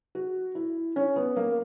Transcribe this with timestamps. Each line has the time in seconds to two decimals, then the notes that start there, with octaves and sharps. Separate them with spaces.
0.15 F#4
0.55 E4
0.96 C#4
1.16 B3
1.36 A#3